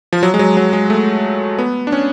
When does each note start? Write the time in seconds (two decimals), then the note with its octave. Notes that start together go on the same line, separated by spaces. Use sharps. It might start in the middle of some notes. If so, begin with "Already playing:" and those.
0.13 F3
0.23 F#3
0.34 G#3
0.39 F#3
0.57 F#3
0.73 G#3
0.90 A3
1.58 B3
1.87 D4
1.92 C#4